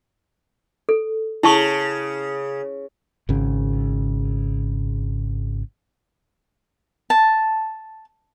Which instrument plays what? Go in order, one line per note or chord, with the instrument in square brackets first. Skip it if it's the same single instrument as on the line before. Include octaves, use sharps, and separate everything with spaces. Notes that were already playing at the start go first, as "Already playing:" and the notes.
[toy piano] A4
[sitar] C#3 [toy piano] E4 A5 C#6
[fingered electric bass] G#1 C#3
[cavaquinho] A5